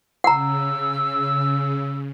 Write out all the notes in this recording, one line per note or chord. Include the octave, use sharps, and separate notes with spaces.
C#3 F#5 A#5 E6